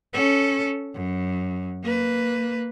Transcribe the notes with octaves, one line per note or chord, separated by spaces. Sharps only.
C#4 A4
F#2
A#3 B4